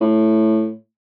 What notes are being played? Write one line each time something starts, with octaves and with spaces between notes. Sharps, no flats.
A2